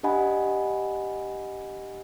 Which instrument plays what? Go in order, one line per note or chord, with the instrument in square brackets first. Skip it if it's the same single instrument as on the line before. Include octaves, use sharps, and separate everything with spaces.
[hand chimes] D4 G4 D#5 F#5 G#5 B5